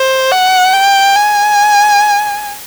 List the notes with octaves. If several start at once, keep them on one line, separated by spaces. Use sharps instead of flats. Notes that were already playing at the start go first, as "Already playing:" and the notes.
Already playing: C5
F#5
G5
G#5